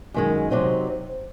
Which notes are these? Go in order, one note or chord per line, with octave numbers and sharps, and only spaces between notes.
F#2 D#3 G#3
C3 F#3 C4 D#4